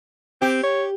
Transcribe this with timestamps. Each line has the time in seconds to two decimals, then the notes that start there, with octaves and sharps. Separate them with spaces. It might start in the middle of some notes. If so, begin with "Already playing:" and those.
0.42 C4 G4
0.63 C#5